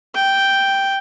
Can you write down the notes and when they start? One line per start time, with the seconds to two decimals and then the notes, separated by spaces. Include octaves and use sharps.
0.15 G5